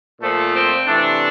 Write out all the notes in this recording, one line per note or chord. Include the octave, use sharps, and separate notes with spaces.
A#2 F3 A3
C4
C3 E3 A3 D4